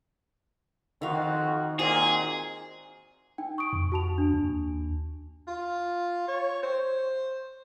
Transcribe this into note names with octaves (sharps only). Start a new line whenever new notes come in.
F2 D#3 F#4 F5
A#2 G#3 C4 F#4 G#4
D#4 G5
C#6 D#6 D7
F2
F#4 A5 F7
D4
D#2
F4
C#5
C5